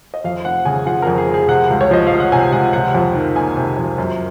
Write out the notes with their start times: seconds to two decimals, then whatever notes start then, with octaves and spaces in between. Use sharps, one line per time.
0.14 D#5
0.24 F2 F5
0.45 F1 F#5
0.65 C#3 G#5
0.86 F3 F#5
1.02 A#4
1.07 F2
1.18 G#4
1.28 F1
1.34 G#4
1.48 C3 F#5
1.70 C#2
1.81 C#5
1.91 F3 D#5
2.07 C#2 F5
2.20 F#5
2.32 C3 G#5
2.52 C#2 F#5
2.73 C3 F#5
2.95 F2
3.15 D#3
3.36 A#3 G#5
3.57 C3
3.77 F2
3.98 F#2